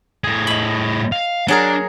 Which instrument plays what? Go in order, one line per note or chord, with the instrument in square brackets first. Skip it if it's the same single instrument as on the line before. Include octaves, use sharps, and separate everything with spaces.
[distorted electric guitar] A2 G#4
[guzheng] D#5 B5
[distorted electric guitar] F5
[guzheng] F#3 G#4 A#4 [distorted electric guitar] D4